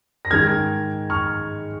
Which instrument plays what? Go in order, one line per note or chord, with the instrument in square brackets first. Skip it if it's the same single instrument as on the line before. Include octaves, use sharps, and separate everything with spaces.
[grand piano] A#6
G#2 D#3 G#3 F6 G#6
C#6 F6